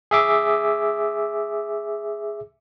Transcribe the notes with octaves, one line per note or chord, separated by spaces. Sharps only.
G#4 E5 D6